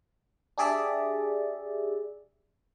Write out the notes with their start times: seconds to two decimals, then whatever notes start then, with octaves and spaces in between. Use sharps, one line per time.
0.58 D4 G4 G#4 D5 E5